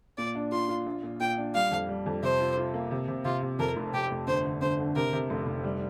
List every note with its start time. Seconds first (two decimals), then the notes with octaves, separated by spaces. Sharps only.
0.18 A#2 D5
0.35 D4
0.52 F4 C6
0.69 F4
0.86 A#1
1.03 A#2
1.20 A#2 G5
1.37 D4
1.54 G3 F5
1.71 F2
1.89 G3
2.06 F2
2.23 C3 C5
2.40 F4
2.57 F4
2.74 A#3
2.91 C3
3.08 C3
3.25 C3 F4
3.42 C3
3.59 F2 A#4
3.76 F1
3.93 F1 G4
4.11 F1
4.27 G1 C5
4.45 D3
4.62 G1 C5
4.79 D3
4.96 C3 A#4
5.13 C3
5.30 F1
5.46 F1
5.64 G3